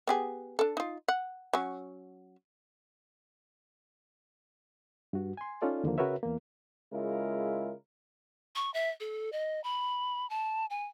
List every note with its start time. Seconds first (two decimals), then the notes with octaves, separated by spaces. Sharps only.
0.07 B3 G4 G#4
0.59 D4 A4
0.77 D#4 F4
1.08 F#5
1.53 F#3 C#4
5.13 G2 F#4
5.37 G#5 C6
5.62 C#4 D#4 F4 A4 D5
5.84 D#2 D3 F3 A#3
5.98 C#3 F#4 A#4 B4 C#5 E5
6.23 E2 A#3
6.92 C#3 G#3 E4 F4 A#4
8.56 C#6
8.74 E5
9.00 A4
9.32 D#5
9.64 B5
10.30 A5
10.70 G#5